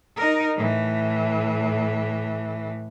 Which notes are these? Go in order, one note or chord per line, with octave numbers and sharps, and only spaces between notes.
D#4 A#4
A2 E3